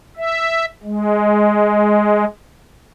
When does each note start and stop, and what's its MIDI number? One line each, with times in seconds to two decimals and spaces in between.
0.17 0.65 76
0.83 2.25 56